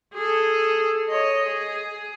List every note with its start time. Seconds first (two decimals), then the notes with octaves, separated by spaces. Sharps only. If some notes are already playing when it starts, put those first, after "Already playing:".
0.14 G#4 A4
1.09 C#5 D#5
1.47 G#4